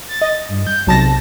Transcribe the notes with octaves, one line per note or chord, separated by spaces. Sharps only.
A6
D#5
G2
G6
B1 C3 A5 A#6